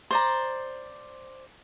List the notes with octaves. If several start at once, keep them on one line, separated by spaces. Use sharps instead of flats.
C5 D5 A#5